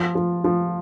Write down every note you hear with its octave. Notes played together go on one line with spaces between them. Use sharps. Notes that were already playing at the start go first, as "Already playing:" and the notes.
Already playing: F3
F3
F3